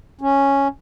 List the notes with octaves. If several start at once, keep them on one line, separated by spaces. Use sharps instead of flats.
C#4